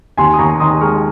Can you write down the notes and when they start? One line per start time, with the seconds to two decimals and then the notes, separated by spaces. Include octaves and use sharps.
0.17 D#2 G#5 C6
0.34 D#6
0.39 D#2 A#5 C#6
0.60 D#3 C6 D#6
0.81 G#3 C#6 F6